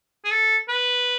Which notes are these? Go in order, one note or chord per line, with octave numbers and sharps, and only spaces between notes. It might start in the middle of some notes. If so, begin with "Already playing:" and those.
G#4
A4
B4